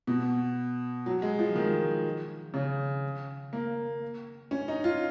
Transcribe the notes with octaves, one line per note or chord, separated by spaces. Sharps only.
B2
F#3
G#3
F3
D#3
C#3
A#3
C#4
D#4
F4